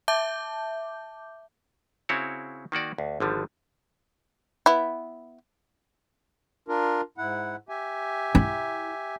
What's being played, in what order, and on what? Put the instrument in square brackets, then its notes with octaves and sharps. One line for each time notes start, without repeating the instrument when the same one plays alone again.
[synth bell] E5 A5 D6 G6
[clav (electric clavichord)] C#3 C4 E4 F#4 C#5
D#3 A#3 F#4 D5
D2
G#1 D3 F3 G3
[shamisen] B3 E4
[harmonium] D4 F4 A#4
G#2 E4 F#5
G4 E5 G#5
[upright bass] E4